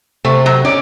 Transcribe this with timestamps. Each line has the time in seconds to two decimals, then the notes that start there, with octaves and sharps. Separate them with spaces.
0.25 C3 A3
0.46 F#3
0.65 C#4 D5